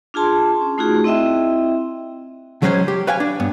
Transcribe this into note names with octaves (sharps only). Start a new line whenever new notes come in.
D4 F4 G#4 A5 C6
C#4
A3 D#4 F4 F#4 G#4
C4 E4 D#5 E5 G5
C#2 F#3 G#3 C#4 C5 C#5
G4
B4 C#5 F5 G5 G#5
D4
G2 B3